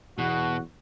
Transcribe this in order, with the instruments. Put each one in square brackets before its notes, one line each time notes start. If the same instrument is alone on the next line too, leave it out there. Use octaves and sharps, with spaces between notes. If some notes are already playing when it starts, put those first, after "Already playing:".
[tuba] E2 [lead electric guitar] B2 [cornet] F#4